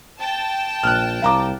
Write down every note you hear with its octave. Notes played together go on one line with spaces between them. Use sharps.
G5 A5
A#1 F6 F#6
C2 F5 A#5 D6